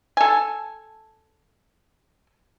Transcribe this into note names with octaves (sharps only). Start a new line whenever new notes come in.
A4 G#5